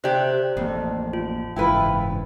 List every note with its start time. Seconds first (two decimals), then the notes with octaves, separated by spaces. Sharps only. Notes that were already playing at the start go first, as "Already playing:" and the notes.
0.04 C3 G4 C5 D5 F#6
0.57 A1 F2 A#3
1.13 F4
1.56 F#1 G#2 E3 E4 F4 B4 G5